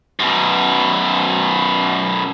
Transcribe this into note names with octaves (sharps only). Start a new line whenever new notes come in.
F#2 B2